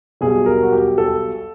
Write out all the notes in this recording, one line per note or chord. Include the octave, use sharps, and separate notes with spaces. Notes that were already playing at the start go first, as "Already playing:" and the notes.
B1 B2 G3 G#4
A#4
F#4
G4
A4